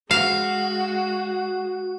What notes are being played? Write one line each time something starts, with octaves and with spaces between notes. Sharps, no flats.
G#3 F#4 F5 C7